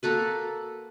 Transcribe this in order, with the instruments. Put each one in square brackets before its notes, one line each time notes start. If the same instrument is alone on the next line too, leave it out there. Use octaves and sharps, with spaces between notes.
[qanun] A#3 F#4 A4 B4